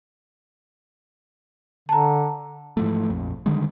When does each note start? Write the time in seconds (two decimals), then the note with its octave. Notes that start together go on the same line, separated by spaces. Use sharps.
1.89 D3 A5 A#5
2.77 G#2 E3 F3 A3
3.10 A#1 F2
3.46 D3 D#3 G3 G#3